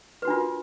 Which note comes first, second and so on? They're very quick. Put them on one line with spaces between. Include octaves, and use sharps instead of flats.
B4 F#4 D4 F4 A#4